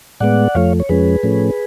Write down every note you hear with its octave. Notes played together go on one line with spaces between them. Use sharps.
A2 G#3 B3 D5 F#5
F2 F3 A3 C#5 F5
C#5
F2 F3 G#3 C#4 G#4 B4
A2 F3 A3 C#4